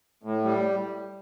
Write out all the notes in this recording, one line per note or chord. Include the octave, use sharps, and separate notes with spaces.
A2
G3